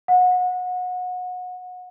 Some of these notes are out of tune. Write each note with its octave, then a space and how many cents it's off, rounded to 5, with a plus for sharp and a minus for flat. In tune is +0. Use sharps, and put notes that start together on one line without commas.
F#5 -30